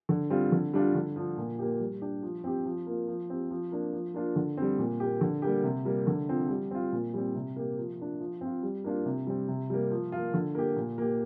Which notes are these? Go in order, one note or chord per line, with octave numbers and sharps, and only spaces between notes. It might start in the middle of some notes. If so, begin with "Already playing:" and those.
D3
G3 C4 F4
D3
G3 D4 F4
D3
F3 D4
A#2
A#3 G4
G3
D4 G4
F3
C4 G4
F3
A#3 F4
F3
C4 G4
F3
A#3 D4
F3
A#3 D4 F4
D3
G3 C4
A#2
A#3 G4
D3
G3 A#3 G4
C3
G3 A#3
D3
F3 C4
G3
C4 F4
A#2
G3 C4
C3
A#3 G4
F3
A#3 D4
F3
C4 F4
G3
A#3 D4 F4
C3
G3 C4
C3
G3 A#3
F3
A#3 F4
D3
A#3 G4
A#2
A#3 G4